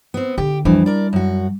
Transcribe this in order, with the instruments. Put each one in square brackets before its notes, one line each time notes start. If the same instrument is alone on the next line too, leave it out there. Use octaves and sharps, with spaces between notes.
[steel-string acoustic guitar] B3 C4
[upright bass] D3 [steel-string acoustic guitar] G4
[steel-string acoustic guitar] F2 E3 [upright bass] G3 D4
[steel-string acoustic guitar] A#4 D5
F#2 F#4